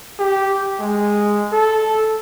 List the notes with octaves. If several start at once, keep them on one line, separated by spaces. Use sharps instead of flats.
G4
G#3
A4